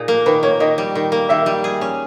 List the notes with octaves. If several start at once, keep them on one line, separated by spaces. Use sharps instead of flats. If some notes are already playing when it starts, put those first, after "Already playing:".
Already playing: A#2 D#4 G#4
A#3
D#3 B4
A#3 C#5
D#3 D#5
G3
D#3
A#3
D#3 E5
G3
G#4
C#4